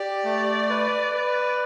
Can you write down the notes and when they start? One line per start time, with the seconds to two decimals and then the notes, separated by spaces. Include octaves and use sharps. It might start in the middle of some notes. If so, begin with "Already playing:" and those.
Already playing: G4 D5
0.25 A3
0.70 B4
1.14 B4